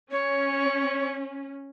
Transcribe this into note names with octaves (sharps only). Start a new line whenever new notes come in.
C#4 C#5